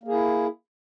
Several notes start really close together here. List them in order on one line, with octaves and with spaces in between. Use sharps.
A#3 G#4 E4